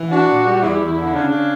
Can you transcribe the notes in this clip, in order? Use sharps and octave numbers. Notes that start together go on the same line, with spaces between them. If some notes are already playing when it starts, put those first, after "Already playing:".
Already playing: E3
D4 F#4
A#2
G3
E2 E4
E2
D3
C#3 D4
C#3